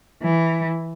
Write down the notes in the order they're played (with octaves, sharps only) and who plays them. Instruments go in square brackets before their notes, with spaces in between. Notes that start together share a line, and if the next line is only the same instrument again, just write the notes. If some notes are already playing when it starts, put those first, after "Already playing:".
[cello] E3